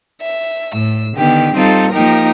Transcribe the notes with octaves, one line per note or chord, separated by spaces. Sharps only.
E5
A2 E6
D3 D#3 B3 G4
G3 C4 D#4 F4 A4
F3 A#3 D#4 G4 A#4